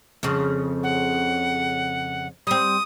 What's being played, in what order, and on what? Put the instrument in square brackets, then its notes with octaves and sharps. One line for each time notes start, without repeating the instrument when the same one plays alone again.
[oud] F2 C#3
[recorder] F#5
[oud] G3 C4 [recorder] D#6